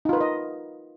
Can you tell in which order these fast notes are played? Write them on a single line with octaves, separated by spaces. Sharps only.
D#4 F4 B4 A#4 D#5